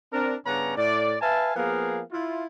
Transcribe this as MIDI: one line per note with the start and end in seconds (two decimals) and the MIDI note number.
0.13 0.34 60
0.13 0.34 62
0.13 0.34 70
0.45 0.75 43
0.45 0.75 49
0.45 0.75 59
0.45 0.75 61
0.45 0.75 62
0.45 0.75 82
0.77 1.16 45
0.77 1.16 74
1.21 1.54 71
1.21 1.54 76
1.21 1.54 77
1.21 1.54 80
1.21 1.54 81
1.55 2.02 53
1.55 2.02 58
1.55 2.02 59
1.55 2.02 68
1.55 2.02 70
1.55 2.02 77
2.11 2.46 64
2.11 2.46 65